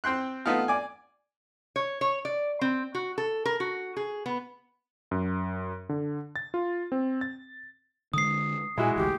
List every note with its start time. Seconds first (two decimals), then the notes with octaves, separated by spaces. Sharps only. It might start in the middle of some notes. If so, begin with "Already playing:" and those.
0.04 C4 G5 C6 F#6
0.46 A3 B3 D#4 F4
0.68 D5 G#5
1.76 C#5
2.01 C#5
2.25 D5
2.61 C4
2.95 F#4
3.18 A4
3.45 A#4
3.60 F#4
3.97 G#4
4.26 B3
5.11 F#2
5.89 D3
6.36 A6
6.54 F4
6.92 C4
7.21 A6
8.14 D3 G#3 D#6 C7
8.78 A#2 G#3 E4 F#4 G#5
8.96 A1 D2 G4